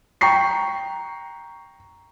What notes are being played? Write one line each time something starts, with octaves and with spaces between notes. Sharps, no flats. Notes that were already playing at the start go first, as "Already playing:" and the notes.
G5 A#5 C#6 C7